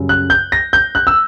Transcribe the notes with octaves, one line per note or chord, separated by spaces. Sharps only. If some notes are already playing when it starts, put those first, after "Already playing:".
Already playing: F#2 C#3 G3
F#6
G6
A#6
G6
F#6
E6